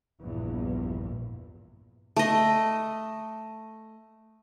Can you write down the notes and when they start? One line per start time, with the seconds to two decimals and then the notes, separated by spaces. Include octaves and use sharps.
0.20 A#1 E2 G2
2.16 A3 D#5